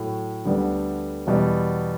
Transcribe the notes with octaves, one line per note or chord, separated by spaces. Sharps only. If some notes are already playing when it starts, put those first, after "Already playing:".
Already playing: A2 F#3 A3
D2 D3 G3 B3 D4
E2 B2 G3